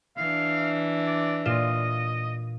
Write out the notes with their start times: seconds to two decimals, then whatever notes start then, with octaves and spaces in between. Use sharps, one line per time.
0.17 E3 D4 F5
1.05 D5
1.45 A#2 F4 D#5 E7